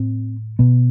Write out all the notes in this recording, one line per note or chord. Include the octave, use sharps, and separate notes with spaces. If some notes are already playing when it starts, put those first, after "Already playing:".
Already playing: A2 C4
B2 B3